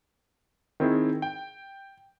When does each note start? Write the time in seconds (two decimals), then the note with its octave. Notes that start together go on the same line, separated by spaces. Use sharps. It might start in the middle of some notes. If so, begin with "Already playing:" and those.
0.80 D#3 C4 E4 G#4
1.22 G5